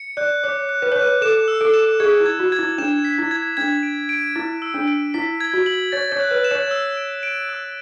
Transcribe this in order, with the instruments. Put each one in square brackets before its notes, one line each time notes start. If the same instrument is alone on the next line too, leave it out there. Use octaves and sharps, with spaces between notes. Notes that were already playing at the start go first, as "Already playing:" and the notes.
Already playing: [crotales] C#7
[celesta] D5 [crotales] F#6
[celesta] C#5 [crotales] D6
[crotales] F#6
[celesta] B4
[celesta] C#5 [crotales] F#6
[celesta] B4
[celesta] A4 [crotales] E7
[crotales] E6
[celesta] A4
[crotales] E7
[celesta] G#4 [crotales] G#6
[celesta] E4
[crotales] G#6
[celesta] F#4
[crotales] G#6
[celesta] E4
[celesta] D4 [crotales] E7
[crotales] B6
[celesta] E4
[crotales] G#6
[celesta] D4 [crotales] G#6
[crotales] D7
D7
[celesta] E4 [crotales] G#6
[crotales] E6
[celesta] D4
[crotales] D7
[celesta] E4 [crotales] B6
[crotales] G#6
[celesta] F#4
[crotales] F#7
[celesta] C#5 [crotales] A6
[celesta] C#5
[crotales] F#6
[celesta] B4
[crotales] E7
[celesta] C#5
[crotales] E6
D7
D7
E6